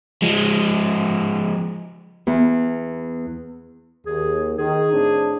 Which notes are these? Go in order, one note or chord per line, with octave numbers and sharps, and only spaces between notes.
F3 G#3
E2
D#2 G#4
D#3 G#4
A2 C4 D4